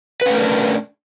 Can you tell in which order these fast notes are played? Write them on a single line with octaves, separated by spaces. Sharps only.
B4 C#4 A3 A#4 D4